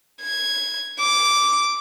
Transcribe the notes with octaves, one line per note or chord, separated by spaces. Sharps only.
G#6
D6